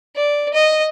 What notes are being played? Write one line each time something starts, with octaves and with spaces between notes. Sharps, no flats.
D5
D#5